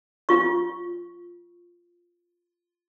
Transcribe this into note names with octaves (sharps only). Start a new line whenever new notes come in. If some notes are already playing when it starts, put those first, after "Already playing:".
F4 C#6